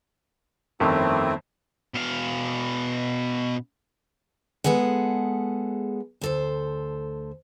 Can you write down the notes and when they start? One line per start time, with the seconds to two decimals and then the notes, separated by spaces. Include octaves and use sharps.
0.80 G1 F2 D#3 A3 C4 E4
1.94 B2 F5
4.64 G#3 B3 G#4 A4 F#5
6.21 D2 A4 C5